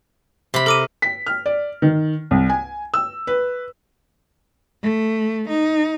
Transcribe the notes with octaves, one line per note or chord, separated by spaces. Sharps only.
C3 B5
A4 A#4 D6 D#7
B6
F6
D5
D#3
C2
G#5
E6
B4
A3
D#4